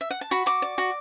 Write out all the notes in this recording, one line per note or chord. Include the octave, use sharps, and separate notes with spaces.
E5
F#5
A5
F#4 B5
F#4 D6
D5
F#4